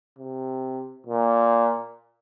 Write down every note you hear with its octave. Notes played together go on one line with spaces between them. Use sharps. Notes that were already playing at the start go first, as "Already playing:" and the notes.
C3
A#2